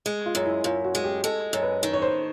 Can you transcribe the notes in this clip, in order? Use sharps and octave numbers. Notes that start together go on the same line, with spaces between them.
G#3
F4
F#2
E4
F#2 F4
F#4
G#3
G4
G#3 A4
F#2
B4
D#3
C#5
C5